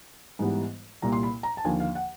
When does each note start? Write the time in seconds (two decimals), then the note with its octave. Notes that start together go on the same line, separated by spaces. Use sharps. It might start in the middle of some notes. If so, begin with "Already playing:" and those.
0.39 G#2 E3 G3 B3
1.02 C2 A#2 G3 A#3 A#5
1.12 C6
1.23 B5
1.43 A#5
1.57 A5
1.65 D#2 D3 F3 A#3 G#5
1.80 F5
1.95 F#5